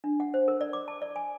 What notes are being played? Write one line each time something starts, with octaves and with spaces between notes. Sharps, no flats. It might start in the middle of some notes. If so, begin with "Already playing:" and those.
D4
F#5
C5
A#4
D5
D6
A5
D5
G#5